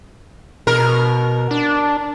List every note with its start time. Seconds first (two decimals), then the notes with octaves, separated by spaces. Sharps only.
0.67 B2 A#4
1.51 D4